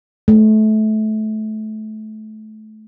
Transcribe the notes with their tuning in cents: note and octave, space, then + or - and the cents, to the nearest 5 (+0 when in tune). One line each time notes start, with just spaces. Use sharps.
A3 -25